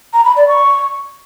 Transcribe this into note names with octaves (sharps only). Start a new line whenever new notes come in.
A#5
B5
D5
C#6